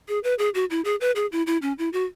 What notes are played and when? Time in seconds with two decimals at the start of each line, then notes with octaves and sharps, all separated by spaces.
0.08 G#4
0.24 B4
0.39 G#4
0.54 F#4
0.70 E4
0.85 G#4
1.01 B4
1.16 G#4
1.32 E4
1.47 E4
1.62 C#4
1.78 E4
1.93 F#4